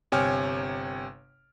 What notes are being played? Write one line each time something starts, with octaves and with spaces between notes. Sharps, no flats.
G1 C3 C#5 G5 G#5 F6